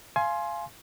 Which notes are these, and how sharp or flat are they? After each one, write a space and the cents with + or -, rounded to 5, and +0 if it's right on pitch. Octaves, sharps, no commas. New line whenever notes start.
F5 -20 G#5 +20 C6 +10